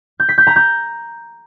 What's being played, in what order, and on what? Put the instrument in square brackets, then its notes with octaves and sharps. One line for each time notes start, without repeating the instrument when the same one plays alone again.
[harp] G6
B6
G6
A#5
G6